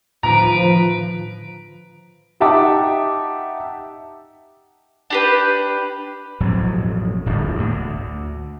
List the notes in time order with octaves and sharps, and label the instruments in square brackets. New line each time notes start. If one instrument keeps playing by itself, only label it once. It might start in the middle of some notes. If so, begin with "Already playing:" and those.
[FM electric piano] A2 D3 D#3 [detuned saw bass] F3 [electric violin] B4 D7 [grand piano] A#5
[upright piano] D#4 G4 E5 F#5 A5 D6
[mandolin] D4 G4 B4
[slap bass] A1 F2 B2 F#3
D1 G1 F2 D3
D2 A2
D2